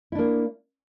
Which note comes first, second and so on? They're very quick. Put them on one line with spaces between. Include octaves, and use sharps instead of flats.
E4 D4 A#3